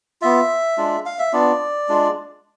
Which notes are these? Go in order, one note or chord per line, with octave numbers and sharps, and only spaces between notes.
B3 F4 E5
G#3 D4 F4
F5
E5
B3 D4 F4 D5
G#3 D4 F4